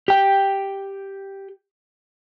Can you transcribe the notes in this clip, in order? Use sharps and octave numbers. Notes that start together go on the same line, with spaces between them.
G4 G5